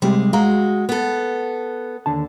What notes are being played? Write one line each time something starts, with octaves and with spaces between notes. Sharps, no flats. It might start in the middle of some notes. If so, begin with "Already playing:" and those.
C3 G3 G#3 G4
G#3 F#4 F5 A#5
B3 A4
D#2 D3 A5